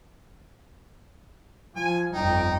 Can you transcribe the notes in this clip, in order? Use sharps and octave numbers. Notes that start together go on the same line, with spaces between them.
F3 G#5
G1 F2 D#4 G5